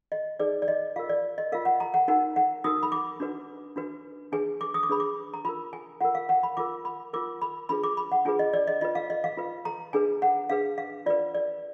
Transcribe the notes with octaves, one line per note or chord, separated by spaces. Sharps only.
D#5
D#4 G#4 B4 D5
D5
D#5
F4 A#4 F5
D5
D#5
F4 A#4 F5
F#5
A#5
F#5
D#4 F#4 A#4 F#5
F#5
D#4 F#4 A#4 D#6
B5
D6
D4 F#4 B4
D4 F#4 B4
D4 G#4 B4 G#5
D6
D#6
D6
D4 G#4 B4 B5
D6
A#5
F4 A#4 B5
G#5
F4 A#4 F#5
F5
F#5
B5
F4 A#4 D6
B5
F4 A#4 D6
B5
D4 F4 G#4 B4 B5
D6
B5
F#5
D4 F4 G#4 B4 G#5
D#5
D5
D#5
F4 B4 D#5
F5
D#5
F5
F4 B4
A#5
D4 G#4 B4 G#5
F#5
D4 G#4 B4 F5
F5
F4 B4 D5
D5